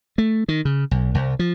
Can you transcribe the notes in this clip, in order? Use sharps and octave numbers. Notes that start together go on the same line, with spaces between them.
A3
D#3
C#3
B1
C2
F3